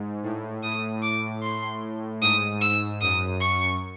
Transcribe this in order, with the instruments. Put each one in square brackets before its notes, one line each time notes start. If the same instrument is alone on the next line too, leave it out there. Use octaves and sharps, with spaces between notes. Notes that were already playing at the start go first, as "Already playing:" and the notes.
Already playing: [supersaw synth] G#2
A2
[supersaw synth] A2 [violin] D#6
[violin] D6
C6
[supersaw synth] G#2 [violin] D#6
[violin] E6
[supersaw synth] F#2 [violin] D#6
[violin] C#6